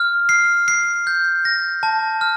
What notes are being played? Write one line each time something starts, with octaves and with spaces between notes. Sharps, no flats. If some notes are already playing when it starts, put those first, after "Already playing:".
Already playing: F6
C7
C7
G6
A#6
A5
F6